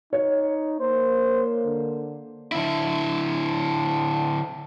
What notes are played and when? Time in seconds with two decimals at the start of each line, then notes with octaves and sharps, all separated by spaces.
0.13 D#4 C#5
0.80 A#3 C5
1.65 D3
2.52 D3 E4